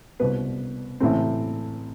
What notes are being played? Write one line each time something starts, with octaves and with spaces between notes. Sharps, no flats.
C2 B2 B4
A1 A2 E3 C4